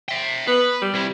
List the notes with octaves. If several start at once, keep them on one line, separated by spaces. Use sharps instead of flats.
E5 G5
B3 B4
G3
C3 E4